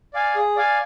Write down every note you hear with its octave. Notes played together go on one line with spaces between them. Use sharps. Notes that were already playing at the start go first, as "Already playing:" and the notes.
D5 F5 G#5
G#4
D5 F5 G#5